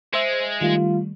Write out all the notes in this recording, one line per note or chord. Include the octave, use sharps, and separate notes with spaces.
G#3 C5 E5
D#3 G3 A3 F4